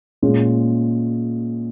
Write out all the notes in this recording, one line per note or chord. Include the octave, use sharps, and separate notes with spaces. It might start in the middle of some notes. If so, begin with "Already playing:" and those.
A#2 G#3 C#4